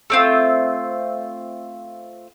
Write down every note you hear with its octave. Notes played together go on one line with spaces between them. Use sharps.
A3 C4 F4